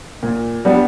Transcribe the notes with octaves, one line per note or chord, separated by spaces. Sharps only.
A#2
G3 B3 D4